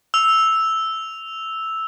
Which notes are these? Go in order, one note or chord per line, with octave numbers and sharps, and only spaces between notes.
E6 F7